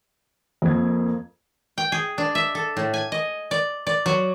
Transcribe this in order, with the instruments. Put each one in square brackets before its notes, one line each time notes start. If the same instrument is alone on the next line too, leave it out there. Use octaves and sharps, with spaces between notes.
[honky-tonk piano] F2 G#6 [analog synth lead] A#3
[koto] G5
G#4
D4
E5
A4
A2
G#5
D#5
D5
D5
F#3